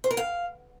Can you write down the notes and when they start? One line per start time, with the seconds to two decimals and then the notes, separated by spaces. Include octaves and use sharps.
0.04 C5
0.11 A#4
0.17 F5